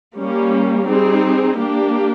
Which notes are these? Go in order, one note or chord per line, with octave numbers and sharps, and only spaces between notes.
G3 A#3 C#4
G3 C4 D#4 G#4
A#3 D4 G4